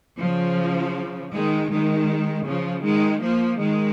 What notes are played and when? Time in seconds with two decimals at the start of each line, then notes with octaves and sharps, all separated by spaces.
0.18 C#3 F3
1.32 D#3 G#3
1.70 D#3 G#3
2.46 C#3 F3
2.83 D#3 G#3
3.22 F3 A#3
3.59 D#3 G#3